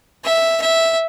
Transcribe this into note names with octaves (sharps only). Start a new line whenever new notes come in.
E5
E5